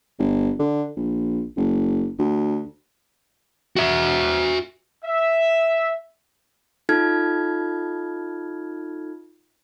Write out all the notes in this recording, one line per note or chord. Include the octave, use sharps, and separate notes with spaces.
G1
D3
A#1
F#1
D2
F#4 E5
E5
D#4 F4 A4 F6 G#6